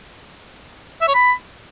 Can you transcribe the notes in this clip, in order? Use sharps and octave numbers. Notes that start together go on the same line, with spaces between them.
E5
C#5
B5